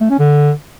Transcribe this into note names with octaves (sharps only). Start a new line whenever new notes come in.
A3
C#4
D3